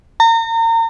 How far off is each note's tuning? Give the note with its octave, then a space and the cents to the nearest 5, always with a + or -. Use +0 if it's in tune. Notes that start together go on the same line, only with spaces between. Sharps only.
A#5 -35